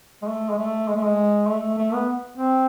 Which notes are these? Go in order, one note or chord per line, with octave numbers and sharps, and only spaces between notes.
G#3
A3
G#3
A3
G#3
A3
G#3
A3
A3
B3
C4